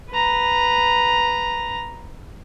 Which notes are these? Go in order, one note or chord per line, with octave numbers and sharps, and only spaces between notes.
B4 A#5